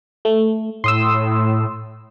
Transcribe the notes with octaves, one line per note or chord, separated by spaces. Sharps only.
A3
A2 C6 D#6 E6